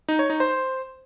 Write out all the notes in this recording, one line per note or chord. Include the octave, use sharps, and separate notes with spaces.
D#4
C#5
D#4
C5